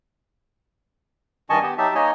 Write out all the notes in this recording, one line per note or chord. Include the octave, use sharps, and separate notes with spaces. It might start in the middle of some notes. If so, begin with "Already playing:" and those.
G2 D#3 D#5 G#5 A5 C#6
B3 G4
F#3 D#4 G4 E5 A5
A#3 D#4 C#5 D#5 G#5